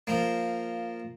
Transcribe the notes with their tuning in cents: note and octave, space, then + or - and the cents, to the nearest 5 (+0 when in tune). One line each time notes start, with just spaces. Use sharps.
F3 +0 A#3 -10